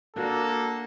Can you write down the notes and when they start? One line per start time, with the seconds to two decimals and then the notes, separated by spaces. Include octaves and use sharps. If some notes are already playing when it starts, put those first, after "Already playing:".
0.16 A#3 D4 F#4 A4